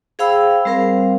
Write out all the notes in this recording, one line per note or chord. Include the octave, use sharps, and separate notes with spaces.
G#4 C5 F5 G5 B5 E6
G3 C4 A#4 C5 F5